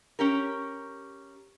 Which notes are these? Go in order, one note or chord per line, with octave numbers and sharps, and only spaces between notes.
C#4 G4 A#4